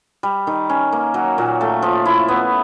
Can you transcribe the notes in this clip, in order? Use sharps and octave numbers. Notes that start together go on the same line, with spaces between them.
G3
D#3
C#4
A#3
F#3
A#2
A3
F3
E4
B3